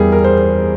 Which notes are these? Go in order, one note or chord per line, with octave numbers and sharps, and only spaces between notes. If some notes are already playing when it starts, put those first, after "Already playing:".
Already playing: E2 E3 G3 G#4 A#4
A#4
C5